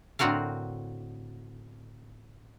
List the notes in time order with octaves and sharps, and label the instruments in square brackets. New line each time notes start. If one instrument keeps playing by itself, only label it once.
[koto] A2 D3 C4 F#4 A#4 F5